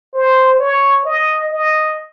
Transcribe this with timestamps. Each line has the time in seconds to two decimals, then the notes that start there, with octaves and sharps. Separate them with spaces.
0.14 C5
0.59 C#5
1.05 D#5
1.52 D#5